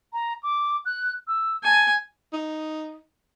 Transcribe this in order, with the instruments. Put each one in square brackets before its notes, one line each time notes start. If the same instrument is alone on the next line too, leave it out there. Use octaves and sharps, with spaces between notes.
[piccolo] A#5
D6
F#6
E6
[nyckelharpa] G#5 [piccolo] A5
[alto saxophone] D#4